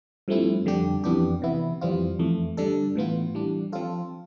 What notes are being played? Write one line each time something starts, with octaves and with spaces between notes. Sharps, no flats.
G2 F3 A3 C4 E4
F2 D3 G3 D4 G4
F2 E3 B3 D4 G4
C3 E3 B3 E4
F2 E3 G3 C4 F4
F2 E3 A3
G2 D3 G3 D4 A4
A2 E3 B3 F4
E3 G3 D4
F3 C4 F4 A4